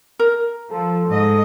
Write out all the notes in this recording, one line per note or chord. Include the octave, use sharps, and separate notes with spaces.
A#4
F3 A4
G#2 D#5